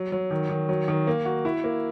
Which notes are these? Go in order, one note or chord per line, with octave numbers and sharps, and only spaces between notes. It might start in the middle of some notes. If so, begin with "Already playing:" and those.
Already playing: F#3
F#3
D#3
D#3
F#3
D#3
A#3
F#4
E4
A#3